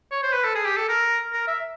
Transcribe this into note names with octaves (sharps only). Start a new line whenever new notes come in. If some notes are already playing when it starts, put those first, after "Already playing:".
C#5
C5
B4
A4
G#4
G4
A4
A#4
A#4
E5